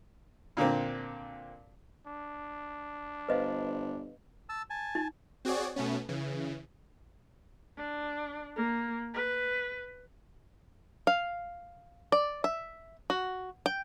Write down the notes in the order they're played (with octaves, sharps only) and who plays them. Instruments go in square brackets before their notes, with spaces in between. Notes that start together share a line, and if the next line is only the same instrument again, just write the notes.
[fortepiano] A#2 D3 A#3 C4
[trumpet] D4
[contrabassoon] G1 [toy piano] B4 D#5 F5 [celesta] C5
[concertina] A5 E6
G#5 A5
[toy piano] D#4
[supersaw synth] C4 F#4 G#4 C#5 D5
B2 A3 B3 C#4
C#3 E3
[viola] D4
A#3
B4
[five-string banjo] F5
D5
E5
F#4
G5